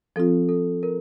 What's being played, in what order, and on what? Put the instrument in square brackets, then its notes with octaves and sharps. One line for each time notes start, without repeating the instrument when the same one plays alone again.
[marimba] F3 C4 F4 [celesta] A4
[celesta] A4
A#4